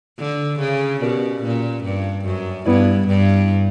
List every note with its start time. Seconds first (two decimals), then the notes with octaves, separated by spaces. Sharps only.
0.19 D3
0.60 C#3
1.01 B2 C#4 G4 A#4 D5
1.43 A#2
1.84 G2
2.25 F#2
2.66 G2 G3 B3 E4 B4 D5
3.08 G2